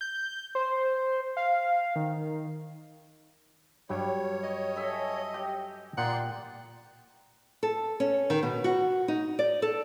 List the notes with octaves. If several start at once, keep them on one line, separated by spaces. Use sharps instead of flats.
G6
C5
F5
D#3
G2 F#3 G3 C#5 G5
D#5
A4 E5 G#5
G4
A#2 A#3 D#4 D5 F#5 G5 C6
A4
C#4
D#3
B2
F#4
D#4
D5
A4